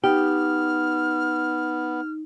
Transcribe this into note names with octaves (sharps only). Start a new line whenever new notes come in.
B3 D#4 G4 F6